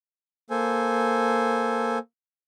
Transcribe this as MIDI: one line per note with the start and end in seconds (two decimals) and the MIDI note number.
0.50 1.98 58
0.50 1.98 69
0.50 1.98 72
0.50 1.98 80